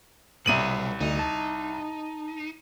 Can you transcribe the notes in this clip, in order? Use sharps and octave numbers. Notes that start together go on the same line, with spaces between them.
C2 B2 F#3 G3 D#7 F#7
D2 D#4
A5